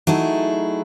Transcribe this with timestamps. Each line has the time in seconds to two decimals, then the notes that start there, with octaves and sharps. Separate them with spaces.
0.07 F#3 A3 D#4 E4 G#4